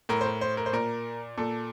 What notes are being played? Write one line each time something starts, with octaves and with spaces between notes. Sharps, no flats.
A2 A#4
C5
A#4
C5
A#4
C5
A#2 A#4
A#2 A4